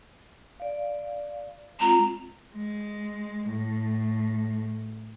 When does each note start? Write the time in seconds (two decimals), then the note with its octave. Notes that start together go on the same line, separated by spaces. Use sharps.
0.60 D5 F5
1.80 G#3 C4 F4 A#5
2.56 G#3
3.51 A2